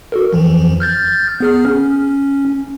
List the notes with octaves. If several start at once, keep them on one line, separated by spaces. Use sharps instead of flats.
F#4 A4 A#4
F2 E3 F3
F6 G6 A6
B3 G#4 F6
C#4